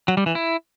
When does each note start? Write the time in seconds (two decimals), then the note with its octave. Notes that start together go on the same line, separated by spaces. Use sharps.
0.08 F#3
0.17 G3
0.26 E3
0.35 E4